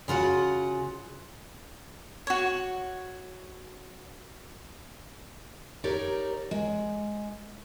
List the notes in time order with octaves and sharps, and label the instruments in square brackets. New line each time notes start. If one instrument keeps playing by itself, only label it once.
[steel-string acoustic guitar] C#3 F4 F#4 F#5
[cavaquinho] F#4 C#5
[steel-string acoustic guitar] D#4 G4 A#4 C#5 D5
G#3